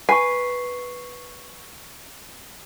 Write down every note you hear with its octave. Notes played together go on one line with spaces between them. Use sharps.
B4 G#5 C#6 C7